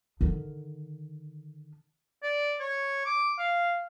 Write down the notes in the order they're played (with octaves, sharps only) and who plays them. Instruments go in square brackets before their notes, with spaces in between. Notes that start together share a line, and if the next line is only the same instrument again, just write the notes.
[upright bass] D3 D#3
[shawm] D5
C#5
D6
F5